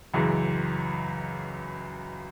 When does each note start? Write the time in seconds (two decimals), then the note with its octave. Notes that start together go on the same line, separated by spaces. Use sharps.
0.14 C#2 F#2 E3 G#3